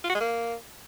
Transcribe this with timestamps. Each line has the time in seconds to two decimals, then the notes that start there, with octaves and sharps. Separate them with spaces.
0.04 F4
0.10 F#4
0.15 G#3
0.20 A#3